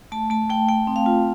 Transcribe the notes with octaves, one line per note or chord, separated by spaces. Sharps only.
A3 A5
A3 A5
A3 G5
A3 G5
C4
F5
F4